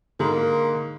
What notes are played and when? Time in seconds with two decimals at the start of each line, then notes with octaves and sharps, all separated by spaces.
0.20 G#2 D3 A#3 D#4